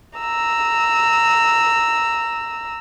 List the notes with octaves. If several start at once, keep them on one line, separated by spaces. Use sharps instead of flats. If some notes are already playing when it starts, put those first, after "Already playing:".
A#5 E6